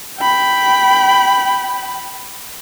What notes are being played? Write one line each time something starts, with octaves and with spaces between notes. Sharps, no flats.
G5 B5